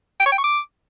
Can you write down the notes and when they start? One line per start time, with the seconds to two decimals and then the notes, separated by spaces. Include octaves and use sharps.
0.20 G5
0.26 C#5
0.32 G5
0.38 C#6
0.44 D6